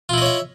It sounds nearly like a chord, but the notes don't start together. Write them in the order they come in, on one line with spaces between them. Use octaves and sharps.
F4 E4 D#5 C#5 E5